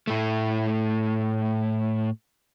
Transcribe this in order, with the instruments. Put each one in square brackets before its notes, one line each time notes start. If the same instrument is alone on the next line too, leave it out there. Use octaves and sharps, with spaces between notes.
[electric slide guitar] A2 A3